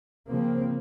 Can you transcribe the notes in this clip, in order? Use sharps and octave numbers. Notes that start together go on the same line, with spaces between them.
C#3 F3 A#3 C4